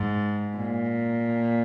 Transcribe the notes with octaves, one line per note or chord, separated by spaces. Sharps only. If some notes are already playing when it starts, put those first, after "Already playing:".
Already playing: G#2
A#2